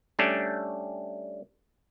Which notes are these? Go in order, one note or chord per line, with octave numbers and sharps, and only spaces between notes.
G3 A3 C#4 D4